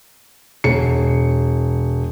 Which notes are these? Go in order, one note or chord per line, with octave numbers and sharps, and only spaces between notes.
E1 C#7